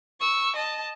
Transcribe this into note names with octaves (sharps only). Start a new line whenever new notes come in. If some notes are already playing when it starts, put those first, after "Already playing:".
C#6 E6
D#5 A5